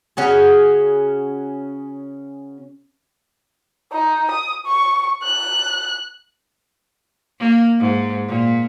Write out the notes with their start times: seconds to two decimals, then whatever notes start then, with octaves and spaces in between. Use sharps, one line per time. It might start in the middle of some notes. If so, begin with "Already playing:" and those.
0.17 C#3 C#4 F#4 G#4
3.93 D#4
4.31 D#6
4.66 C#6
5.23 F#6
7.40 A#3
7.80 G#2
8.27 A#2